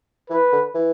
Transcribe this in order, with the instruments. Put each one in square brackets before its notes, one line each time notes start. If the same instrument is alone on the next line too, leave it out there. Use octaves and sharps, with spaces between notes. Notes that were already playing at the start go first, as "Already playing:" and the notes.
[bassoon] E3 [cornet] B4
[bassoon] D3
E3